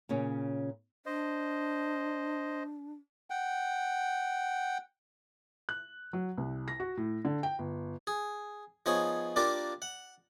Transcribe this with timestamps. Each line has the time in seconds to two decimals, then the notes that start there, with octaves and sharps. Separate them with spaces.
0.09 A#2 C#3 C#4
1.06 D4 C5 D#5
3.30 F#5 G5
5.69 F#6
6.13 F#3
6.38 C2
6.68 A#6
6.80 F#4
6.97 A2
7.25 D3
7.43 G5
7.59 G1
8.07 G#4
8.86 F3 B3 D#4 G#4 C#5
9.36 A#3 D4 F4 G4 A#4 D5
9.82 F#5